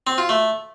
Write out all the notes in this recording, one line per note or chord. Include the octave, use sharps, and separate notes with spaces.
C4
F4
A3